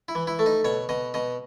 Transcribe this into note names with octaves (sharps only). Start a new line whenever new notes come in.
E4
E3
E4
A3
D#4
B2 C#5
B2 D#5
B2 D#5